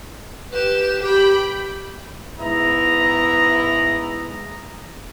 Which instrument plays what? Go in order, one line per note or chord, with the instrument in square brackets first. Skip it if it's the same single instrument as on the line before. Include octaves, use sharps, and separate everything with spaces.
[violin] G4 E7 [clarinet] B4
[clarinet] G4 [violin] G5 B5
[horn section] G#2 B3 E4 D#5 A#5